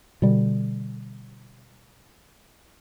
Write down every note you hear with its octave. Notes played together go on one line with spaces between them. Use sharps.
B2 D3 G3